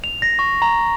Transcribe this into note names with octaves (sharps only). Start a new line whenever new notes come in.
F7
A#6
C#6
A#5